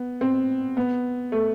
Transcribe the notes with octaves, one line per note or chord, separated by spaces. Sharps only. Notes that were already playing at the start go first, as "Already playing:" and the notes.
Already playing: B3
C4
B3
A3